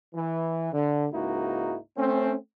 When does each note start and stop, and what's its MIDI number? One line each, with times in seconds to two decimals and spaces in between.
0.15 0.71 52
0.73 1.06 50
1.13 1.76 37
1.13 1.76 44
1.13 1.76 58
1.13 1.76 63
1.13 1.76 64
1.13 1.76 66
1.97 2.35 57
1.97 2.35 60
1.97 2.35 61